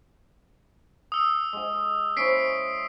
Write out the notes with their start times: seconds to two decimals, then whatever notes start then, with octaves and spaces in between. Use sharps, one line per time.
1.12 D#6 E6
1.53 G#3 G#5
2.17 C#4 E4 C5 B6 C7 D7